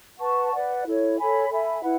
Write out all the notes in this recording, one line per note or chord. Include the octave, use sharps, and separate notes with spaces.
B4 F#5 A5 C#6
B4 D5 F#5
E4 A4 C#5
A4 C#5 G#5 B5
A4 E5 G#5 B5
E4 B4 F#5